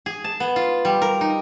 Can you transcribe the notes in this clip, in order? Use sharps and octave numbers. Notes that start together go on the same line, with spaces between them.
G#4
A5
B3
F4
G3
A#4
D#4